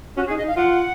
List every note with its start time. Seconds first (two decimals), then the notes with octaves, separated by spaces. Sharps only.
0.17 C#4 F#4
0.26 G#4
0.30 D#4
0.36 D#5
0.43 D#4
0.47 F5
0.56 F4 F#5